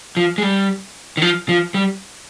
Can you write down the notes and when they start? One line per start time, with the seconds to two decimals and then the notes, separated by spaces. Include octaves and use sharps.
0.17 F3
0.38 G#3
0.43 G3
1.17 D#3
1.22 F3
1.49 F3
1.74 G3